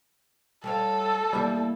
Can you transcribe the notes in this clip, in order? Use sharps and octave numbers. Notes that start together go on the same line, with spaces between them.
G3 A4 C#5 F5
E2 G3 A#3 E5